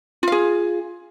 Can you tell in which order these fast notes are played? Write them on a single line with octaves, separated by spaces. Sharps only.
F4 F5 G#4